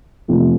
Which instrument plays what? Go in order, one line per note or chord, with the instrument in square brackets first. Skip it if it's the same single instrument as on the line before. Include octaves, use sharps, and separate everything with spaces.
[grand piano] F2 C3 F3 A3 A4